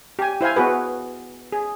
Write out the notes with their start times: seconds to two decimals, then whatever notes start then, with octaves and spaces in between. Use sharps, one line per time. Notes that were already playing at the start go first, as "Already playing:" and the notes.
0.19 G4 G#5
0.41 E4 C5 F5 G#5
0.56 B3 F#4 G#4 B4
1.52 G#4